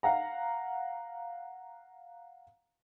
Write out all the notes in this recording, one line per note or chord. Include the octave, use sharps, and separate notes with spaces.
F5 F#5 A#5